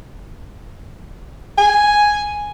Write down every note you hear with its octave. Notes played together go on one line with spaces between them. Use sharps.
G#5